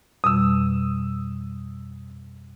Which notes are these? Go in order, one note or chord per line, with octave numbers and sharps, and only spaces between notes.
F2 B2 G3 D#6 E6